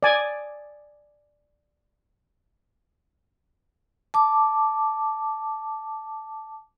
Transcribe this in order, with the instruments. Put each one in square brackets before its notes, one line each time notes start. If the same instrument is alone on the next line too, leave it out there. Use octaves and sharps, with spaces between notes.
[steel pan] D5 G#5
[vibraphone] A5 D6